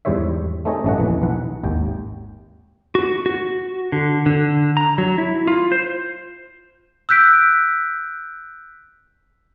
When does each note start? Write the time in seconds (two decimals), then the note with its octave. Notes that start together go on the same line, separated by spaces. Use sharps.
0.05 E2 G#2 G3 C5 C#5 E5
0.65 A3 C4 D#4 G#4 C#5 D#5
0.84 A1 G2 A3 C#4 D#5 F#5
0.98 A#1 E2 E3
1.22 B1 E3 F#5
1.63 G#1 D#2 G5
2.95 F#4
3.26 F#4
3.92 D3
4.26 D3
4.77 A#5
4.98 F#3
5.18 E4
5.47 F4
5.72 C5
7.09 E6 F#6 G6 B6 D7